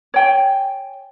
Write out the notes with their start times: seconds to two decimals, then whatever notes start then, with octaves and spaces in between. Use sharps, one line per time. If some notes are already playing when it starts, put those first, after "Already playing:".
0.14 C#5 G5 G#5